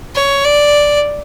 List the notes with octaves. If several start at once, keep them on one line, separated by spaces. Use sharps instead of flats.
C#5
D5